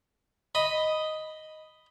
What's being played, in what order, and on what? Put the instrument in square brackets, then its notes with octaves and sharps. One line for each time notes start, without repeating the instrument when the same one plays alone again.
[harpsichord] D#5 B5